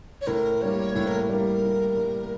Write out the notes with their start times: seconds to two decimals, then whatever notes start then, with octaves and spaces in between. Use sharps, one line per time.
0.21 C#5
0.27 A2 A#4
0.61 G3 A#3 C#5
0.95 A2 C#5
1.07 A#4
1.29 G3 A#3 A#4
1.64 A2
1.96 G3 A#3